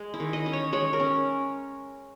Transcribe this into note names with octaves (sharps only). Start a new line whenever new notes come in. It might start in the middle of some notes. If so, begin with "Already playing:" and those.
Already playing: G#3
E4
D#3
D#5
C#4
C#5
G#3 C#5
A#4
C#4